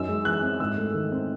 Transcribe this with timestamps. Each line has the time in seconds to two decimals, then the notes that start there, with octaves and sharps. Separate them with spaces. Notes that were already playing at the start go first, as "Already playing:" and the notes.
Already playing: F#2 D#4 E6
0.08 G#3
0.25 E3 F#6
0.42 C4
0.60 G#2 E6
0.77 A3
0.94 D#3
1.12 C4